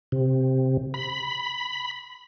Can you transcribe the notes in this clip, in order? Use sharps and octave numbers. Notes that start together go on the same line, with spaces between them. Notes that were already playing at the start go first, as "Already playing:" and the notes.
C3
B5